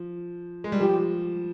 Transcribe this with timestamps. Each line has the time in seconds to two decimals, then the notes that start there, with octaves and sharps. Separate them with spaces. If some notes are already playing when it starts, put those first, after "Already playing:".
Already playing: F3
0.64 G#3
0.72 G3
0.80 F3 G4